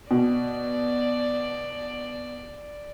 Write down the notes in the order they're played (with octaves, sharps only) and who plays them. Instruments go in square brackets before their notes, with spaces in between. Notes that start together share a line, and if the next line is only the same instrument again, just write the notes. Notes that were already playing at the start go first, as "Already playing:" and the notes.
[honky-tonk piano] B2 [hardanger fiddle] D5